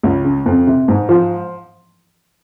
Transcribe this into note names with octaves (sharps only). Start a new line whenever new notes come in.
C#2
C#3
F2
C3
G#2
F3